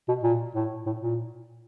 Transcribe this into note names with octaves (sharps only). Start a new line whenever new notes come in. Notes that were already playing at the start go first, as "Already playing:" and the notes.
B2
A#2
A2
A2
A#2